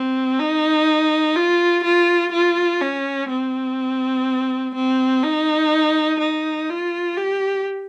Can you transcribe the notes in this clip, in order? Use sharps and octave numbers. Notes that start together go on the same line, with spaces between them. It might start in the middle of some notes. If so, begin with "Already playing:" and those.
Already playing: C4
D#4
F4
F4
F4
C#4
C4
C4
D#4
D#4
F4
G4